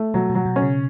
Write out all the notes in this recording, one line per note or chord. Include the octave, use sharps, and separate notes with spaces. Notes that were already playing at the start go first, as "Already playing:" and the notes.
Already playing: A3
B2 F#3
B2
F#3
B2
C#4
C#3